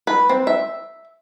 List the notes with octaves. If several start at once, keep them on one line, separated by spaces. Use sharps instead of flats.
B4
C4
E5